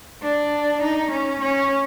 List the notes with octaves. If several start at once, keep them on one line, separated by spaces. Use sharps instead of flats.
D4
D#4
C#4
C#4